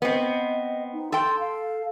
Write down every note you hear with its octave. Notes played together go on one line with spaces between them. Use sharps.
B3 C4 D#5
D#4
A4 G5 C6
F5